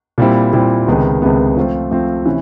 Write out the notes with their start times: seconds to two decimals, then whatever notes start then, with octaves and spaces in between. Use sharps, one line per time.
0.18 A#2 G3 C4 E4
0.53 A#2 G3 C4 E4
0.87 C#2 C3 D#3 G#3 B3
1.22 C#2 C3 D#3 G#3 B3
1.57 F3 A3 C4 F4
1.91 F3 A3 C4 F4
2.26 C3 E3 C#4